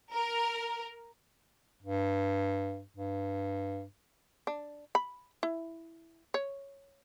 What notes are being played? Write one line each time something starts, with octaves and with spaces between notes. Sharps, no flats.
A#4
G2
G2
D4
B5
E4
C#5